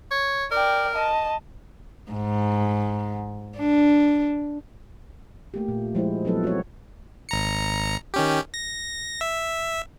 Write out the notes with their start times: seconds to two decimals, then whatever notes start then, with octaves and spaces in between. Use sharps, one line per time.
0.11 C#5
0.52 A#4 D5 G5
0.95 D#5 A5
2.12 G#2
3.58 D4
5.54 A3 A#3 G4
5.68 A#2
5.95 F3 G#3 E4 C5
6.25 F3 F#3 B3 D#4 A4 B4
6.43 C4 F#4 A4 A#4 C#5
7.29 G#1 A#5 C#7
8.14 D#3 C#4 G4
8.54 A#6
9.21 E5